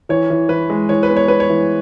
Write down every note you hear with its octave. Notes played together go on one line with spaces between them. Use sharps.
E3 C#5
E3
E3 B4
G#3
E3 C#5
B4
B3
C#5
B3 B4
C#5
E3